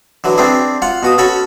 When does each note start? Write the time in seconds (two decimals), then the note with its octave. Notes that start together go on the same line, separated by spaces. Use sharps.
0.24 D3 E3 F#3
0.38 C4 D4 E4 G#4
0.82 F4 F5 F#5
1.03 B2 F#4 D#6
1.18 C#4 F#4 A4 C#5 B5